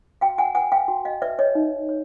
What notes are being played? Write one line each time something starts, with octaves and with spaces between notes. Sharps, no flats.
F#4 F5 G5
F#5 G#5
B4 F#5 G#5
F5 G5
F#4
D#5 F5
B4 D5 E5
C#5 D#5
D#4
C#5